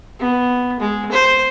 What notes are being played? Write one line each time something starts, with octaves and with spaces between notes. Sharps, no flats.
B3
G#3
C5